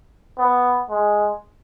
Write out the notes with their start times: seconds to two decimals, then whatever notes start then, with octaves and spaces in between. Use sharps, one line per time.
0.38 B3
0.90 G#3